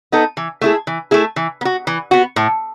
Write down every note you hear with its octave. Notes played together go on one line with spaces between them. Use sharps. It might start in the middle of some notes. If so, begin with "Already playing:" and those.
B3 D#4 A4
E3
A3 E4 G#4
E3
A3 E4 G#4
E3
B3
F#4
E3
B3 F#4
A2